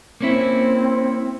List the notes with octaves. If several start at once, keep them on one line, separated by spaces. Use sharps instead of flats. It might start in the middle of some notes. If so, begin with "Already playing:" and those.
A#3 C4 C#4 E4